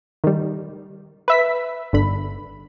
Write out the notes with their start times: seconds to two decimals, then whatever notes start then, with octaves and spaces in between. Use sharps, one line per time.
0.24 D#3 G3
1.28 B4 E5 B6
1.93 G1 D3 B5